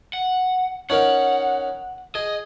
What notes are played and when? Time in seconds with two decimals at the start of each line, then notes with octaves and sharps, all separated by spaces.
0.13 F#5
0.90 C#4 D#4 A#4 F#5
2.15 G#4 D#5